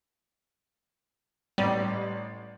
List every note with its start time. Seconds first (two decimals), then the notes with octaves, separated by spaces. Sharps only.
1.58 A1 G3 D5